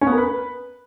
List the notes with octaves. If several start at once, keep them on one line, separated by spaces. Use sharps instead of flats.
C#4
B3
A#4
B4